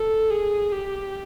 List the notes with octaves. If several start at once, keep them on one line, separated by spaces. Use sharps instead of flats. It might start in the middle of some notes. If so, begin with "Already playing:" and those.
Already playing: A4
G#4
G4